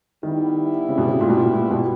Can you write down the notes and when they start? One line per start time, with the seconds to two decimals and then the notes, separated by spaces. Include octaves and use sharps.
0.23 D#3 G3 B3 E4
0.89 C#3
0.98 B2
1.07 C#3
1.21 A#2
1.30 B2
1.37 A#2
1.54 A#2
1.71 B2